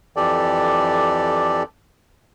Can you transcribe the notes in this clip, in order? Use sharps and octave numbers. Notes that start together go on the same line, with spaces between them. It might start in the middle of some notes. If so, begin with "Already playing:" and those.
F2 E3 G4 A4 D5